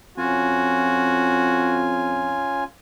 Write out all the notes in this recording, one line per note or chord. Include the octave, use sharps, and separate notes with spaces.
F2 C#4 F4 F#4 G#5